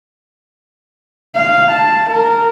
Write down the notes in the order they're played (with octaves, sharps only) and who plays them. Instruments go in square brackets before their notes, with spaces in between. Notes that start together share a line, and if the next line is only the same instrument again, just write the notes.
[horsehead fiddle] F5
A5
A#4